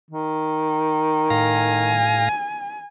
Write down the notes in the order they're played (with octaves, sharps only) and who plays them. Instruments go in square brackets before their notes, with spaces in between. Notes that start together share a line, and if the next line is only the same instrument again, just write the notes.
[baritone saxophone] D#3
[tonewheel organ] A2 F5 A#6 [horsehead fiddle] G#5